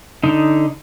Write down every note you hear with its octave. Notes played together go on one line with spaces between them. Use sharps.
D3 D#4